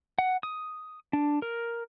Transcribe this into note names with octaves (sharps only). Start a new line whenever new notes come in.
F#5
D#6
D4
A#4